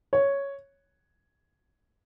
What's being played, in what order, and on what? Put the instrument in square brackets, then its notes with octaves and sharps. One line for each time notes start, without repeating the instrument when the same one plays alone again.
[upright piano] C#5